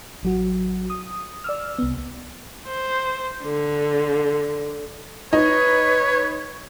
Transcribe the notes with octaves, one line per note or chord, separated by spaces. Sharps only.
A1 F#3 F#4
D#6
D5 E6 F6
C2 B3
C5
D3
D#4 B4 C#5